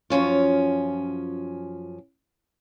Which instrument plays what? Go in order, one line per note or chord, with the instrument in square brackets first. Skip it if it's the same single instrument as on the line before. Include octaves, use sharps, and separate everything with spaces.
[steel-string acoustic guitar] F#2 F3 C#4 F4